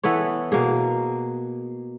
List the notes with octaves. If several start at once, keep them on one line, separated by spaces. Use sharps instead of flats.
E3 B3 A4 C#5
B2 A#3 G#4